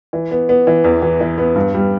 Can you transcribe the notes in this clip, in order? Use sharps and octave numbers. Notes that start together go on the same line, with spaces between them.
E3
B3
B3
E3
E2
E3
E3
B3
G2
G3